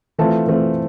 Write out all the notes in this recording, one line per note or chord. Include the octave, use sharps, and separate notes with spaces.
E3 A3 C4 F4 A5
E3 A3 C4 F4